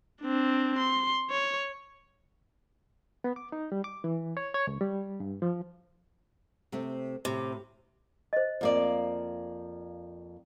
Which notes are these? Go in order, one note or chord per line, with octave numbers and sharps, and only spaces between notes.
C4 D4
C6
C#5
B3
D6
D#4
G3
D6
E3
C#5
C#5
C#2
G3
G2
F3
C3 A3 C4
A2 C3
C5 D#5
F2 A#3 D5